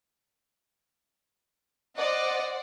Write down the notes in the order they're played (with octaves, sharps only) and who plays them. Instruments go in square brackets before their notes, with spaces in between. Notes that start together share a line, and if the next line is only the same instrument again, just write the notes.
[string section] C5 D5 F#5 [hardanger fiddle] D#5